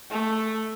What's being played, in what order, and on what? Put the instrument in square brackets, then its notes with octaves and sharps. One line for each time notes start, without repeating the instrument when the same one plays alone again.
[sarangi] A3